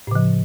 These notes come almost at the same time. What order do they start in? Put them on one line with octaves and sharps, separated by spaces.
A2 C#3 F3